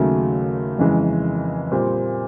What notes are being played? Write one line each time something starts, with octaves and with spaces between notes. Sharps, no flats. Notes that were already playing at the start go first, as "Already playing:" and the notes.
Already playing: D#2 C#3 F#3 A3
F2 C#3 E3 G#3
A#2 G3 C4